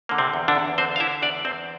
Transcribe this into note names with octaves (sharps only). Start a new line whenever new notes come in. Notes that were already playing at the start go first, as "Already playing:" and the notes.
D3 A#3
C3 C4
E2
D3 D4
E2
D3 C4 C5
F5
D3 E4 E5
E2 D4 D5
E2 C4 C5